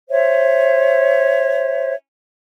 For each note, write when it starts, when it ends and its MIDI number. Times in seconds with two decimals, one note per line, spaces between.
0.11 1.93 72
0.11 1.93 73
0.11 1.93 76